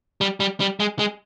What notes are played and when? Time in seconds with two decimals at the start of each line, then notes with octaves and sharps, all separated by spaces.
0.21 G3
0.40 G3
0.60 G3
0.80 G#3
0.99 G#3